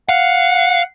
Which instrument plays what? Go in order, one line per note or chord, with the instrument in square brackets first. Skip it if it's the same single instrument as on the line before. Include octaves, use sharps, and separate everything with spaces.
[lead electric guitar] F5 [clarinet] F#5